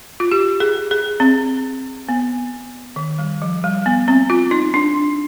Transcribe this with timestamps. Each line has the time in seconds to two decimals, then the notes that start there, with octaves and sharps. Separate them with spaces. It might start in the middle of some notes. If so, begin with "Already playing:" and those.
0.20 F4
0.31 G4
0.60 G#4
0.91 G#4
1.20 C4
2.09 B3
2.96 D#3
3.18 G3
3.42 F3
3.64 G3
3.86 B3
4.08 C4
4.30 F4
4.51 D#4
4.74 D4